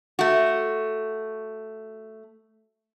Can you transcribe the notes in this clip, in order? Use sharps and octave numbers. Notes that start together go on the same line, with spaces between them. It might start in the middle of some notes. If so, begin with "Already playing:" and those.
A3 F#4